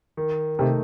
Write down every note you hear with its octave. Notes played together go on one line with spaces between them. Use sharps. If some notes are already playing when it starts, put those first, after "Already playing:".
D#3
C3 A3 D#4